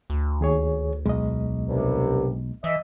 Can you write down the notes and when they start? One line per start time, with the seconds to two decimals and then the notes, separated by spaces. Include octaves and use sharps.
0.10 D2
0.41 D#2 G#4 C#5
1.06 B1 G#3 D#5
1.68 C2 G2 C3
2.64 E3 D#5 E5